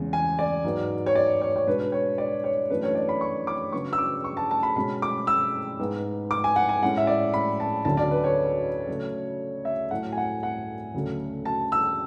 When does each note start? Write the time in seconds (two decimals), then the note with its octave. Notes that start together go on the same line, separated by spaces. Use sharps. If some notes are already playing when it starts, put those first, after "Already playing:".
Already playing: E2 C#3 G#3
0.13 G#5
0.39 D5
0.64 G#2 F#3 B3
1.06 C#5
1.15 D5
1.42 C#5
1.56 C#5
1.67 B2 G#3 D4 B4
1.92 C#5
2.18 D5
2.44 C#5
2.69 F#2 E3 A3 D4 B4
2.83 C#5
2.95 D5
3.09 B5
3.21 C#6
3.47 D6
3.72 C#3 F#3 B3 D4 C#6
3.93 E6
3.98 D6
4.24 C#6
4.37 A5
4.51 A5
4.63 B5
4.76 B2 G#3 C#4 B5
5.02 D6
5.27 E6
5.80 G#2 G#3 B3
6.31 D6
6.44 G#5
6.56 F#5
6.69 G#5
6.82 A2 G#3 C#4 F#5
6.97 E5
7.07 D5
7.34 B5
7.60 A5
7.85 D2 D3 F#3 C#4 A5
7.97 D5
8.11 B4
8.24 C#5
8.88 C#3 F#3 A3
9.65 E5
9.91 A2 F#3 A3 F#5
10.12 G#5
10.17 F#5
10.43 F#5
10.94 D2 C#3 F#3 A3
11.45 A5
11.72 E6